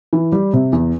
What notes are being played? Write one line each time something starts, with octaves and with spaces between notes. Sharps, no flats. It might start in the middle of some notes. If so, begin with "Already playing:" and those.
E3
G3
C3
E2